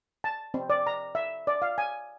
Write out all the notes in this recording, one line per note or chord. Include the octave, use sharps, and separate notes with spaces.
A5
C4
D5
A#5
E5
D5
F5
G#5